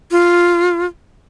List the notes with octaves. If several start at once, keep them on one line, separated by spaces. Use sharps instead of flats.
F4